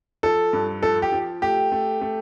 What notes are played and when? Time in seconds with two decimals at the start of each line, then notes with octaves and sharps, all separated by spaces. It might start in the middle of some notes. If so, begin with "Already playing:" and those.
0.23 F3 A4
0.53 G2
0.82 F3 A4
1.02 G4
1.12 F3
1.42 A3 G4
1.72 A3
2.01 A3